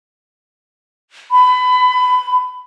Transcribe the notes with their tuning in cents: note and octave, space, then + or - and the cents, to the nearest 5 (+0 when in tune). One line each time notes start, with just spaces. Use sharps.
B5 +25